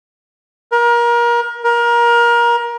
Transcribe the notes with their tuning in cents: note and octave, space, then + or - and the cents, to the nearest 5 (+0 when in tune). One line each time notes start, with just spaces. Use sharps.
A#4 +30
A#4 +25